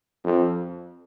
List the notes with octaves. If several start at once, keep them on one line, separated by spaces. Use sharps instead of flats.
F2